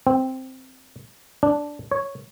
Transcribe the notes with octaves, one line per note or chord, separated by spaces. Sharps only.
C4
D4
C#5